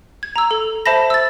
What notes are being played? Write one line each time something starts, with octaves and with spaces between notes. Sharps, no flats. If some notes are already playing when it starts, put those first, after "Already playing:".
G#6
A#5 E6
A4
C5 E5 A5 B5 A#6
E6 A6